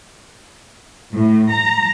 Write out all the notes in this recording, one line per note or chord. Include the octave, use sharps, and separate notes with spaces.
A2
A#5